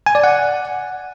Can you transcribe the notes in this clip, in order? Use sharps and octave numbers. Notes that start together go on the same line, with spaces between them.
G#5
D5
F#5